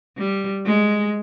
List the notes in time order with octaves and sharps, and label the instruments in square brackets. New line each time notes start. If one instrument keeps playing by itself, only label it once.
[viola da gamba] G3
G#3